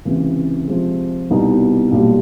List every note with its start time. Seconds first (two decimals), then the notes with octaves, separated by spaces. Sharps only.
0.05 C#2 C3 E3
0.68 C3 F3 G#3
1.30 C2 B2 G3 B3 D#4
1.92 B1 A#2 G3